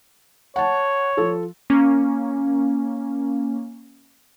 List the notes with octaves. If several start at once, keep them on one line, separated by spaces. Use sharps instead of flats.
C#5 F#5 A5
F3 A4
A#3 C#4